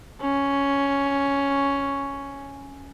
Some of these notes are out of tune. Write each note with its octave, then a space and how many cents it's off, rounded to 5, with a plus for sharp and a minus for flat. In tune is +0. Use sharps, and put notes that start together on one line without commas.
C#4 +5